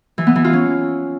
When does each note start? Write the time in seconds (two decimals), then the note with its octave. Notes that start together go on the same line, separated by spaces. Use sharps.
0.18 E3
0.27 B3
0.36 E3
0.44 F4
0.53 C#4